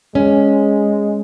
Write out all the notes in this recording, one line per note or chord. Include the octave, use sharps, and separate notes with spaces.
G#3 C#4